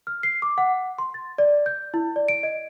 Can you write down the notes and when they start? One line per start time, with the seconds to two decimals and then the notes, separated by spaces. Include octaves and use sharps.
0.07 F6
0.23 C7
0.42 D6
0.58 F#5
0.98 C6
1.14 A6
1.38 D5
1.66 G6
1.94 E4
2.16 D5
2.28 D7
2.43 D#5